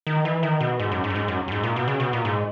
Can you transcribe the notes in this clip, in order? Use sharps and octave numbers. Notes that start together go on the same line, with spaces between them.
D#3
E3
D#3
B2
G#2
F#2
G#2
F#2
G#2
F#2
F#2
G#2
A#2
B2
C#3
B2
A#2
G#2